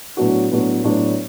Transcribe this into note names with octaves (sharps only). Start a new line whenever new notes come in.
A2 F#3 B3 D4 F#4
A2 F#3 B3 D4 F#4
A2 F#3 B3 D4 F#4